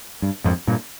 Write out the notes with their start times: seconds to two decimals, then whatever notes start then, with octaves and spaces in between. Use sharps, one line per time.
0.22 G2
0.44 F2 G#2
0.67 G2 A#2